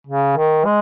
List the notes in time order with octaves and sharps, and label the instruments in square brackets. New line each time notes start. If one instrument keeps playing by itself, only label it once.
[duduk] C#3
D#3
G#3